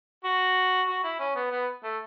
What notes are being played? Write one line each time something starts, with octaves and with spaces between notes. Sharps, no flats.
F#4
F#4
E4
C#4
B3
B3
A3